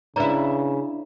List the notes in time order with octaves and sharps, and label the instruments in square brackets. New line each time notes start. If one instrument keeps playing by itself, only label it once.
[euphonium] C#3 [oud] D4 E4 [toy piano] B4 D5 A#5